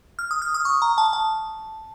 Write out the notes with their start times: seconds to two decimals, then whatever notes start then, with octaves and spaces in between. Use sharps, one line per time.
0.19 F6
0.31 D#6
0.42 F6
0.54 D#6
0.65 C#6
0.82 A#5
0.98 A5
1.13 A5